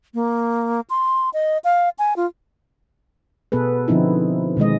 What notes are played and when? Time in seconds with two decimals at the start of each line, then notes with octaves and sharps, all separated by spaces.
0.14 A#3
0.90 C6
1.33 D#5
1.64 F5
1.99 G#5
2.16 F4
3.52 B2 B3 G#4 A4 B4
3.88 D3 F3 C4 D#4 E4
4.57 B2 D#3 G#3 D#5